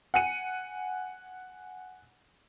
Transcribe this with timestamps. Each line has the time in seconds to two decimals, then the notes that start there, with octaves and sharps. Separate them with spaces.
0.14 F#5 G#5 C#7 D#7